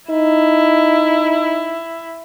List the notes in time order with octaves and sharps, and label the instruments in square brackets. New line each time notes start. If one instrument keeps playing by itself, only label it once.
[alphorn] D#4 [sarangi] E4